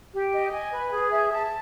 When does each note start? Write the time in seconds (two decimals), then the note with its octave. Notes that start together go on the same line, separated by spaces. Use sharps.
0.13 G4
0.33 D#5
0.52 G#5
0.72 B4
0.92 G#4
1.11 E5
1.31 A5